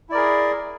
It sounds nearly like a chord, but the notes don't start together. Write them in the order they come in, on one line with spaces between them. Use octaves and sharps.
E4 D5 A#4 G#4